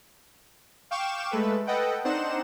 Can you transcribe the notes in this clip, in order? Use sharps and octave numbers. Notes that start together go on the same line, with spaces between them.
F5 G5 C#6 D6 E7
G#3 A3 A4 B4
A4 B4 D#5 F#5 G5
C4 D4 D#4 C5 F#5 E7